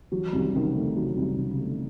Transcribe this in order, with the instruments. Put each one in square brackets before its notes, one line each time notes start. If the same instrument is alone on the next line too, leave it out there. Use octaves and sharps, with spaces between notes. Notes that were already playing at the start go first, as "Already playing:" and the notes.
[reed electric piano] E3 [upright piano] F#3
[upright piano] C2
[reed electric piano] D#3
[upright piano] C3 [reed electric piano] D#3
[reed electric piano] C#3
[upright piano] A3
[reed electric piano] C3 [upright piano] F#3
[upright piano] C2
[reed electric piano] C3
[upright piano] C3
[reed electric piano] C#3
[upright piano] A3